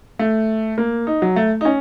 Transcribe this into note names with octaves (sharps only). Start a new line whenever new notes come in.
A3
A#3
D#4
F#3
A3
D#4
C#4